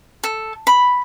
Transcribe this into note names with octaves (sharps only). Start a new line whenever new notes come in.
A4
B5